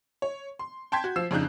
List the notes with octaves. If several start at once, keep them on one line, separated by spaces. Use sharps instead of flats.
C#5
C6
G5 A5 C6 G6 G#6 B6
F#4
F3 E6 C7 E7
F2 C#3 D4 D#4 F#6 G6